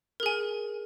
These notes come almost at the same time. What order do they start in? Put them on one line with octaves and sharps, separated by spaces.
A#4 G#4 G#5